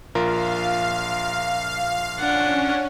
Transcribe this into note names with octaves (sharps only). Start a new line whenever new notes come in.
A#1 F4 A#4 F5
C#4 D4 F#5